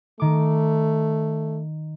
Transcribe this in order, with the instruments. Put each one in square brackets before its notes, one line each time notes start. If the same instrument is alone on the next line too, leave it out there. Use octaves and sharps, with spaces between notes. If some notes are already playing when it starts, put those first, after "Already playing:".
[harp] D#3 D6 [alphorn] A3